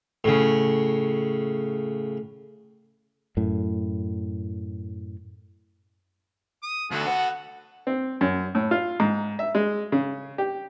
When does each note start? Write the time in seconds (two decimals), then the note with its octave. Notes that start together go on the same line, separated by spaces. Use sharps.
0.24 A2 C#3
3.37 F#2 A2
6.63 D#6
6.91 D2 B3 F#4 A4
7.07 F#5
7.87 C4
8.21 F#2
8.55 A2
8.71 F4
9.00 G#2
9.39 E5
9.55 G#3
9.92 C#3
10.38 G4